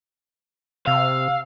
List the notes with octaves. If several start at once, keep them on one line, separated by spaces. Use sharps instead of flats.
C3 F5 E6